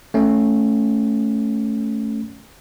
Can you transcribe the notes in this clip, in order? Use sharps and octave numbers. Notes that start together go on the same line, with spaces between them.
A3 C#4